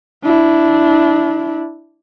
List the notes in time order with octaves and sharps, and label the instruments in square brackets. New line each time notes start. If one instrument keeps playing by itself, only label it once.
[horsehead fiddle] D4 E4